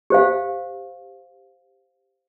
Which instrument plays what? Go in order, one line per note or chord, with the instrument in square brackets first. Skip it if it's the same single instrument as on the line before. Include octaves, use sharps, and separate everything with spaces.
[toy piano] G4 C5 F5